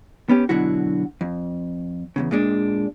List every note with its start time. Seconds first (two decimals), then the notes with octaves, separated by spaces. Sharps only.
0.29 B3 C#4 G4
0.49 B2 D3 F#3 E4 F#4
1.21 F2
2.16 E2 A2 C#3
2.31 A#2 G#3 D4